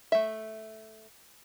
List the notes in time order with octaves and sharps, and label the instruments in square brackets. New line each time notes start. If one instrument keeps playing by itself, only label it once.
[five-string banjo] A3 E5